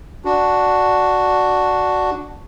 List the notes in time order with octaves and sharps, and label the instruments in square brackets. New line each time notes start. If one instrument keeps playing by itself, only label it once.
[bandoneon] D4 F#4